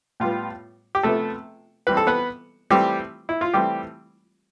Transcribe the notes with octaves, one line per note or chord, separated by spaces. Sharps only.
A2 G3 B3 F4
G4
C3 F3 A3 B3 A4
E3 G3 C4 B4
A4
B3 B4
E3 G3 A3 C4 G4
E4
F4
E3 G3 A3 C4 G4